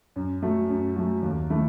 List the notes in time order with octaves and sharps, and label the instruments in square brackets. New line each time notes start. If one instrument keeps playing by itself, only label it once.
[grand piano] F#2
F#3 A3
F#2
F#3 A3
D#2
D#3 A3 E4